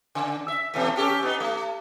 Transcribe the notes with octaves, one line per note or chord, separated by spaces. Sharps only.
C#3
E5
B2 E3 A3
C#4 G4 A4
B3 D#4
A3